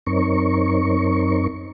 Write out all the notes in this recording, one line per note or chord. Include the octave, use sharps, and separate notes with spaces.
F#2 C4 D#4 A#4 C#5 C#6